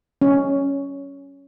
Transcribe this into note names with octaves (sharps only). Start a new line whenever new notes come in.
C#4